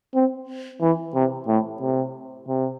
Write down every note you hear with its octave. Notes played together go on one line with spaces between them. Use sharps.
C4
E3
C3
A2
C3
C3